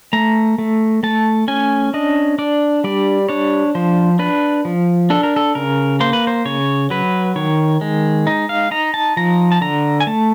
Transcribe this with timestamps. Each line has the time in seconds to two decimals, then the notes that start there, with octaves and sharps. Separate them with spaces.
0.13 A3 A#5
0.58 A3
1.03 A3 A5
1.48 C#4 G#5
1.94 D4 D#5
2.38 D4 D5
2.84 G3 D5
3.29 D4 C#5
3.75 F3 C5
4.19 D4 B4
4.65 F3
5.10 D4 A4
5.23 A#4
5.36 A4
5.55 C#3 A#4
6.00 A#3 C5
6.13 B4
6.27 C5
6.45 C#3 C#5
6.90 F#3 B4
7.36 D#3 C#5
7.81 G#3
8.27 D#4
8.49 F5
8.71 D#4 A#5
8.94 A5
9.17 F3 A#5
9.52 A5
9.61 D3 A#5
10.00 G#5
10.07 A3 A5